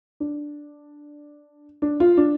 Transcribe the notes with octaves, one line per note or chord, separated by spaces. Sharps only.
D4
D4
F4
D4